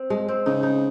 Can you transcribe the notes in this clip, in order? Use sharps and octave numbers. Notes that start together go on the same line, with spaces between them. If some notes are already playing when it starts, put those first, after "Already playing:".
Already playing: C4
G#3
C4
C#3 D#4
D#4